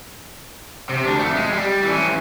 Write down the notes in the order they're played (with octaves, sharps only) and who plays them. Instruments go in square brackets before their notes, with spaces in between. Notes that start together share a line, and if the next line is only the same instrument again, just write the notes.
[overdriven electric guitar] C3
D2 D4
F2 A3
G#3
G3
E3 C#4